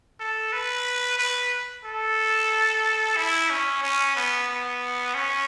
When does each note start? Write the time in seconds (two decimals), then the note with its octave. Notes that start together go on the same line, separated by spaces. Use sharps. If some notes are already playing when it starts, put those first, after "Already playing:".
0.20 A4
0.53 B4
1.19 B4
1.85 A4
3.17 E4
3.50 C#4
3.83 C#4
4.16 B3
4.49 B3
5.14 C#4